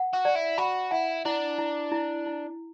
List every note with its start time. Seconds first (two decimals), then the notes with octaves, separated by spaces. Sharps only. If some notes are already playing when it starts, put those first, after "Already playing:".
Already playing: F#5
0.13 F#4
0.25 D5
0.36 E4
0.58 F#4 B5
0.91 E4 F#5
1.25 D4 E4
1.58 E4
1.92 E4
2.26 E4